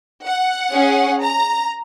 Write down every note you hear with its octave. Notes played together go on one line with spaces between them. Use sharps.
F#5
C#4 G#4
A#5